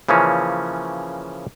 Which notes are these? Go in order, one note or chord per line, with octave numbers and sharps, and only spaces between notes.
C#3 E3 F3 A#3 C#4